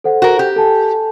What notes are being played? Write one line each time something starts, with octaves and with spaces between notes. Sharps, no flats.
A4 C5 F#5
F#4 A#4
G4
A4 G#5 A5